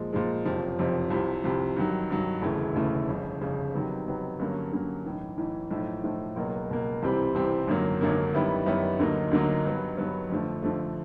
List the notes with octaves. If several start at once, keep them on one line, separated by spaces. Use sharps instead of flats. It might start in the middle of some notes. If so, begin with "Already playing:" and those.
Already playing: A#2 F3 G#3
A#2 F3 G#3
F#1 F2 C3 F3
F#1 F2 C3 F3
C2 C3 F3
C2 C3 F3
G2 D#3 F#3
G2 D#3 F#3
E1 D2 C#3 E3 A3
E1 D2 C#3 E3 A3
G1 F2 C#3
G1 F2 C#3
C3 D#3 F#3 B3
C3 D#3 F#3 B3
G2 D3 F#3 A#3 C#4
G2 D3 F#3 A#3 C#4
B1 A2 E3
B1 A2 E3
B1 A2 F3 A3
B1 A2 F3 A3
C#2 B2 F#3 A#3
C#2 B2 F#3 A#3
C2 C3 E3 G3 C4
C2 C3 E3 G3 C4
G#1 F#2 D3 F#3 A#3
G#1 F#2 D3 F#3 A#3
F#2 D#3 G3 B3 E4
F#2 D#3 G3 B3 E4
D2 D3 F#3 A#3 D#4
D2 D3 F#3 A#3 D#4
G2 D#3 F#3 B3
G2 D#3 F#3 B3
F2 D3 F3 A3
F2 D3 F3 A3